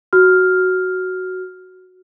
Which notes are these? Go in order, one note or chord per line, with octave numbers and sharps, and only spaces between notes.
F#4 F6